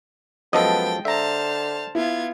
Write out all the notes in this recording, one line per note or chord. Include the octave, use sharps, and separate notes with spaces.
F#2 F3 G#3 B3 A4 D#5 G5 A6
D3 C5 E5 A5 A#5 F6
B3 E4 F4 G#6